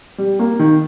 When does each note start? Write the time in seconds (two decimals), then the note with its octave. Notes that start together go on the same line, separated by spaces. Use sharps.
0.18 G3
0.39 A#3
0.59 D#3